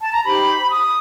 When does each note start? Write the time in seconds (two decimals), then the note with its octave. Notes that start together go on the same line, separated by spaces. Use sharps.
0.01 A5
0.13 A#5
0.25 D#4 G4 C5 B5
0.72 D#6